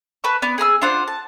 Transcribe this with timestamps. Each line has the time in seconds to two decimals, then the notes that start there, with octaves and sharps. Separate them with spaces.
0.24 B4 A5 C#6
0.42 B3 D5
0.58 G#4 G#5 A#5 E6
0.82 D4 F4 C5 F#5
1.08 A5